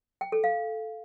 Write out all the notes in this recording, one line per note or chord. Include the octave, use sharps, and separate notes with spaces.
G5
A4
F5